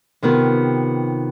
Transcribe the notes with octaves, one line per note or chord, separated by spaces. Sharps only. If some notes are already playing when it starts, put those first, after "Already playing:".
C3 D#3 B3 F4 G4